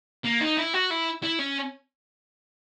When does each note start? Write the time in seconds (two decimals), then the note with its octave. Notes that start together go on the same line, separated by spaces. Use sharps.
0.25 A#3
0.41 D#4
0.57 E4
0.74 F#4
0.91 E4
1.23 E4
1.39 C#4